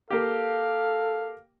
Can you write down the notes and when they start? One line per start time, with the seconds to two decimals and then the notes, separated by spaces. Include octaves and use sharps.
0.10 A#3 G4 A4 F5